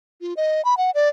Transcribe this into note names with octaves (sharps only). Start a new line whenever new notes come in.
F4
D#5
B5
F#5
D5